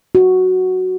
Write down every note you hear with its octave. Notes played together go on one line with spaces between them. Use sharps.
F#4